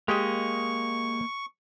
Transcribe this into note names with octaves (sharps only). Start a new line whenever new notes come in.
G#3 A#3 G4 D#5 C#6